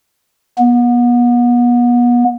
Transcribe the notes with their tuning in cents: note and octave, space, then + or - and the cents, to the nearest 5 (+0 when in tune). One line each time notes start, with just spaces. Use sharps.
B3 -35